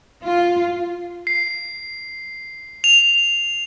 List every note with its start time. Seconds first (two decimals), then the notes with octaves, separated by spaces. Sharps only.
0.23 F4
1.27 C7
2.84 F7